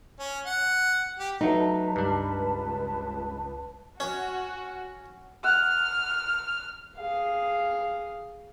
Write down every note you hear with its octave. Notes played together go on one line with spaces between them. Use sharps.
C#4
F#5
G4
F#3 A3 D#4 B4 A5
C#2 G2 D4
C#4 F#4
F#5 F6
G#4 F5